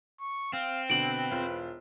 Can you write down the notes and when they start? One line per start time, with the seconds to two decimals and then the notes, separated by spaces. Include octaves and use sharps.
0.20 C#6
0.53 C4 F5
0.90 B2 D3 B4 D7 F#7
1.31 E1 F4 C5